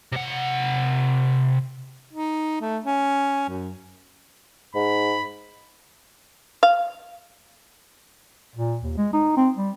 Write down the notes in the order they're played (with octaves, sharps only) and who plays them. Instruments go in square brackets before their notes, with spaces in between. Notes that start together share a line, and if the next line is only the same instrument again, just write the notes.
[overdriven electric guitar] C3 F#5
[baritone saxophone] D#4
A3
C#4
F#2
[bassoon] G#2 [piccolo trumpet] B5
[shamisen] F5
[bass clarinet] A#2
D#2
G#3
D#4
C4
G3